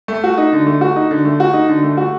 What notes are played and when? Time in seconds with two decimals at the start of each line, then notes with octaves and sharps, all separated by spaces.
0.08 A3
0.24 F#4
0.38 D#4
0.53 D3
0.66 A3
0.81 F#4
0.96 D#4
1.11 D3
1.25 A3
1.40 F#4
1.53 D#4
1.69 D3
1.83 A3
1.97 F#4